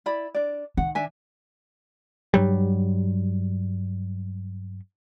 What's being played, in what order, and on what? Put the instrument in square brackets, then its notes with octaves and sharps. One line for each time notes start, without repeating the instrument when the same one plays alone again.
[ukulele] E4 D5 B5
D4 D5
[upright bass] D#3 [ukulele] F#5
[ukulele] D4 E5 G#5
[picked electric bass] G2 F#3 G3